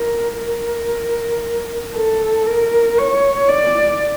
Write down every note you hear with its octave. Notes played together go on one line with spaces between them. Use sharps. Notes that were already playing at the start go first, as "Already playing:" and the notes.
Already playing: A#4
A#4
A4
A#4
C#5
D5